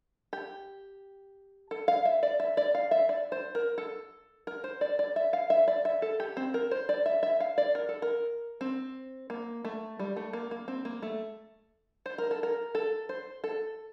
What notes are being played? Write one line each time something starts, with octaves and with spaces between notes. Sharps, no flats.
G4
A4
F5
E5
D5
E5
D5
F5
E5
D5
C5
A#4
A4
A#4
C5
D5
D5
E5
F5
E5
D5
E5
A4
G4
C4
A#4
C5
D5
E5
E5
F5
D5
A#4
A4
A#4
C4
A#3
A3
G3
A3
A#3
A#3
C4
A#3
A3
C5
A#4
A4
A#4
A4
C5
A4